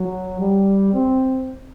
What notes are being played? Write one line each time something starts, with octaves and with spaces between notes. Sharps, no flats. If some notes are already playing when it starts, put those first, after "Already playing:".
Already playing: F#3
G3
C4